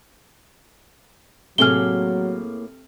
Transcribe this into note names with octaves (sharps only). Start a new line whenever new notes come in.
A2 C3 F#3 A3 A#3 G#4 F6 G7